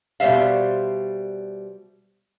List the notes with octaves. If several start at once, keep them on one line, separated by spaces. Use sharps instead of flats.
B2 G3 C5 E5 F5